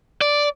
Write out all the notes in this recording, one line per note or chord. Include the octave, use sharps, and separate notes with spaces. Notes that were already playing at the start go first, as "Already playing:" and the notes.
D5